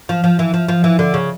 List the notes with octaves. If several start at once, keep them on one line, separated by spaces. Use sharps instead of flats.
F3
F3
E3
F3
F3
E3
D3
C#3